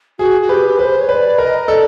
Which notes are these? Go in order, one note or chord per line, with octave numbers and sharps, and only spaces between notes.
F#4 G#4
F#4
G4 B4
B4 C5
C#5
B4 D5
A#4 D#5
A4 D5